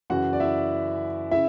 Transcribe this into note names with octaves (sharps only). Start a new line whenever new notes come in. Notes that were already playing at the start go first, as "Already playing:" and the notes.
F#2 C#3 E3 F#4 F#5
D5
E4 E5
C#3 E4 E5